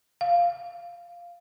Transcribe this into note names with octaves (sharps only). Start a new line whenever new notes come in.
F5